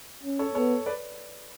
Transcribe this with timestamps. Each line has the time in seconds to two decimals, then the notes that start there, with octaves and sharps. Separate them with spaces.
0.23 C#4
0.39 A4 C#5
0.55 B3 A4 C#5
0.86 B4 D5